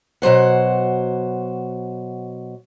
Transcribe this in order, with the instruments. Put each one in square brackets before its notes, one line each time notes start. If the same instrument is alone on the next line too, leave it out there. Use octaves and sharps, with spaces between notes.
[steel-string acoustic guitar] B2 F#3 C5 F#5